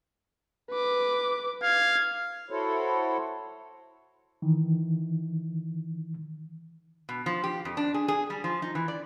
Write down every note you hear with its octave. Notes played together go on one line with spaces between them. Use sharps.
B4 D6
F5 G#6
E4 F#4 A4 C5 C#5
D#3 E3
B2
F3
G4
F2
D4
G#4
G#4
G3
F3
D#4
E3
D5